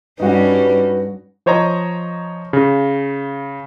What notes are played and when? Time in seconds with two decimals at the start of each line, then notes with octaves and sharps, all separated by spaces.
0.20 G2 G3 C#4 D#4 F#4 B4
1.46 F3 C5 C#5 D#5 A#5
2.53 C#3